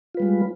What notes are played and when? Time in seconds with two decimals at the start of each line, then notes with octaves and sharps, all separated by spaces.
0.15 F4
0.17 B4
0.20 G3
0.22 G#3